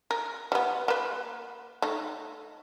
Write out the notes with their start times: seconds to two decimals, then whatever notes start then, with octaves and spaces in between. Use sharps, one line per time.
0.11 A#4
0.52 G3 B3
0.88 A#3 B4
1.82 A3 D#4